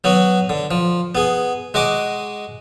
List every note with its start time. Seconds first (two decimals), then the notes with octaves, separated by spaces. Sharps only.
0.04 F#3 B3 F#4
0.49 D3
0.71 F3
1.15 B3 G#4
1.74 G#3 F#4 D#5 D6